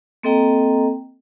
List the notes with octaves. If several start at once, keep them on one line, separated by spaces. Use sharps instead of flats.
A#3 C4 A4 D#5 G5 A#5